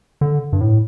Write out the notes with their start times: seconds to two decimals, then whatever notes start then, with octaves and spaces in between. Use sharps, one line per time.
0.21 D3
0.53 G2
0.61 A2